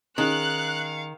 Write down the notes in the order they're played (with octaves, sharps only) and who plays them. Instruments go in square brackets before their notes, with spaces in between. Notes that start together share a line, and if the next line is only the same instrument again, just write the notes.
[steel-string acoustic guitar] D#3 [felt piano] C#4 D#4 G#4 [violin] F5 C#7 [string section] F#6